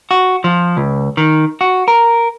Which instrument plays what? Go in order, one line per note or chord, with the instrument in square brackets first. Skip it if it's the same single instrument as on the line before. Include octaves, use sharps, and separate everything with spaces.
[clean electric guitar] F#4
F3
C#2
D#3
F#4
A#4